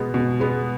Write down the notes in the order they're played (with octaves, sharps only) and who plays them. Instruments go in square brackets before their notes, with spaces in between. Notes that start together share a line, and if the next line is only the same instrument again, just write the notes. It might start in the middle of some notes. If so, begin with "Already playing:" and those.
Already playing: [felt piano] B2 G#3 B3
B2
G#3 B3